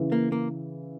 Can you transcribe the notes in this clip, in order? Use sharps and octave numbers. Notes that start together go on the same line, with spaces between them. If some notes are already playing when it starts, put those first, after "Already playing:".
Already playing: C#3 E3
A#3
A#3